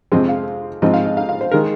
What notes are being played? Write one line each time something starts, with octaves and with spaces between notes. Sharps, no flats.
F2 C3 F3 G#3 C4 D#5
F5
G#2 F3 G#3 C4 D#5
F5
D#5
F5
F5
C5
D#3 G#3 A#4